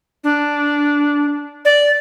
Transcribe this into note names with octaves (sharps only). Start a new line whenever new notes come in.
D4
D5